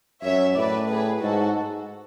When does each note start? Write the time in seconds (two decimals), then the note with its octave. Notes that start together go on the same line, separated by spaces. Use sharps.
0.23 F#2 C#5 E5
0.56 A2 B4 D5
0.88 G#4 B4
1.21 G#2 F#4 A4